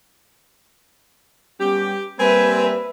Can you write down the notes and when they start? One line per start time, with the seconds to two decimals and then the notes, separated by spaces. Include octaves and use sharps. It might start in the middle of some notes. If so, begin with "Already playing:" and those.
1.60 G3 B3 C#4 G4
2.19 G3 A#3 C4 B4 E5 G#5